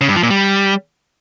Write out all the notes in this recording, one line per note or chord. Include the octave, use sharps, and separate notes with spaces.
C#3
G2
F3
A#2
G3